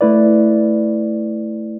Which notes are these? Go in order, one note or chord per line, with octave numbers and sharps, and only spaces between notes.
A3 E4 B4 D5